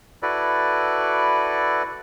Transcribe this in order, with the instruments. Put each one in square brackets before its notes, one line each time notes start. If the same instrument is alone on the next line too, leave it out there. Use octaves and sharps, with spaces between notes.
[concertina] E4 F#4 A4 B4 D5